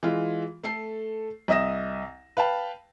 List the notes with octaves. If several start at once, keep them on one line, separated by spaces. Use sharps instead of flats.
E3 G#3 F4
A3 A4 C7
C2 D#5 E5 D#6 A#6 E7
B4 F5 G5 A5